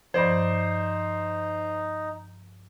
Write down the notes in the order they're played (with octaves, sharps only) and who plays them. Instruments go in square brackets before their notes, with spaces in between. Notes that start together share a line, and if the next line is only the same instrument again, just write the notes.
[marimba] G2 F3 [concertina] D#4 [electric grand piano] C5 D5